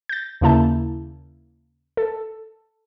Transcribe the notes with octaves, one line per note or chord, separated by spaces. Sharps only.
G6 A6
D#2 C#3 A#3 E4 A5 G6
A4